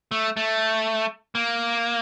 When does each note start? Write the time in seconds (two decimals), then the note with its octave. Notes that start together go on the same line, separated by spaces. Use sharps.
0.11 A3
0.37 A3
1.35 A#3